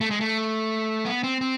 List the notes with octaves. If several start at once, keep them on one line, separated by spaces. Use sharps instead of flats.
A3
G#3
A3
B3
C4
C4